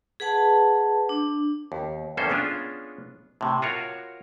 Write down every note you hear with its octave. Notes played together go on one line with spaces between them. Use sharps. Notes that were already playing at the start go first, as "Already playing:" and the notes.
G#4 B4 F#5 A5
D4
D#2
E2 G2 A#3 C#4 A4 C5
G#3 B3 C#4 D4 F4
A2 C3
F4 F#4 A#4 C#5